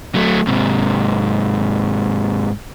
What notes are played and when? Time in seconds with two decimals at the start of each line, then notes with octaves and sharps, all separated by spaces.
0.15 F#3 A3
0.47 G#2 C3